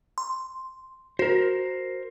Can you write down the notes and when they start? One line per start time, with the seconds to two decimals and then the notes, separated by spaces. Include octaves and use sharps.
0.18 C6
1.19 F#4 A#4 C5